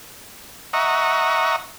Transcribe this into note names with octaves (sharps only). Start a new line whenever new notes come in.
D#5 E5 F#5 A#5 C#6